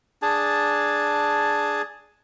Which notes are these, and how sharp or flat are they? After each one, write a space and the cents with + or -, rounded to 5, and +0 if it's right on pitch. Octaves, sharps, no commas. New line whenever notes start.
D4 +0 G#4 +0 A5 +0